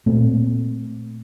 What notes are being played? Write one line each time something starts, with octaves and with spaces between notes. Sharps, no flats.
A#2 A3 C4